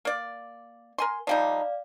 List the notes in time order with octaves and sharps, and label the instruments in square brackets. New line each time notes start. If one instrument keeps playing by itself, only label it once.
[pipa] A#3 D5
A#4 G#5 C6
[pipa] F3 G3 D#4 [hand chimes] D5 F5